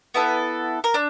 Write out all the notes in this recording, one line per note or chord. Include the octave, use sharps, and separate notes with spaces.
B3 E4 A4
A#4
D4